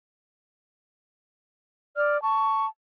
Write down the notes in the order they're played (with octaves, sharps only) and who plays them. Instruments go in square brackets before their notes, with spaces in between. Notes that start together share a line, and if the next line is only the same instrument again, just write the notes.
[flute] D5 [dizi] F6
[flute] A5 [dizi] C#6